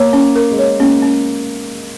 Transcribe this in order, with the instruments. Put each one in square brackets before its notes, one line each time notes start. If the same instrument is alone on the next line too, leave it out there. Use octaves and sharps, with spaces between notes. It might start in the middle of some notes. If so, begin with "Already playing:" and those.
Already playing: [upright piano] A#3 [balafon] C#5
[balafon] C#4
A#4
[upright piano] G#3
[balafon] C#5
[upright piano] A#3 [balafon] C#4
[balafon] C#4